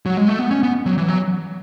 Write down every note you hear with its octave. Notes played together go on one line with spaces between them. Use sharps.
F#3
G#3
A3
B3
C#4
B3
F#3
E3
F#3